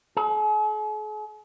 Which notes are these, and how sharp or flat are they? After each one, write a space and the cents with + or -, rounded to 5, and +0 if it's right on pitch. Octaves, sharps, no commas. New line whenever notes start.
G#4 +45